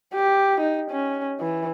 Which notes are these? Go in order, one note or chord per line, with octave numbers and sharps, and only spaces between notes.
G4
D#4
C#4
E3